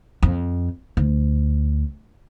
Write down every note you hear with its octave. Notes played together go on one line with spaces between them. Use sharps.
F2
D2